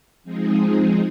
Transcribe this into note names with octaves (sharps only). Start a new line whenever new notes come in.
F3 G#3 C4 D#4 G#4